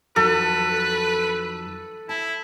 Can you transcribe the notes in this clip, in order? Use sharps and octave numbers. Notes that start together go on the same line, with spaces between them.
F2 D#3 F#3 A4 B4
E4 A5